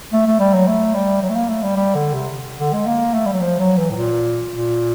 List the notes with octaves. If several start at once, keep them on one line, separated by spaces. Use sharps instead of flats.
A3
A3
G3
F#3
A3
G3
F#3
A3
A#3
A3
G3
G3
D3
C3
D3
G#3
A#3
A3
G3
F#3
F3
F#3
E3
A2
A#2
A#2